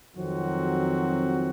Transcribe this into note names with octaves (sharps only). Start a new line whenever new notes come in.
F2 D#3 F#3 C4 F#4